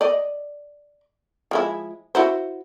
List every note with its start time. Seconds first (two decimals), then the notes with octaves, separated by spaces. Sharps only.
0.01 D5 D#5
1.51 F3 G#3 E4
2.15 E4 F#4 C5